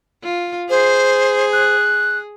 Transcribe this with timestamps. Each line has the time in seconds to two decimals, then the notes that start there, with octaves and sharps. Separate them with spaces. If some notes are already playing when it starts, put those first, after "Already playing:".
0.23 F4
0.70 G#4 C5
1.53 F#6